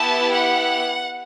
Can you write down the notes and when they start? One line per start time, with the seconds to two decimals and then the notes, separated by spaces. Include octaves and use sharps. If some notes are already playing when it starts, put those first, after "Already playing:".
Already playing: B3 E4 G4 A5
0.33 F#5